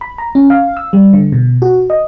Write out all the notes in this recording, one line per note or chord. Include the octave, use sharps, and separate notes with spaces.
B5
A#5
C#4
F5
E6
G3
D3
B2
F#4
D#5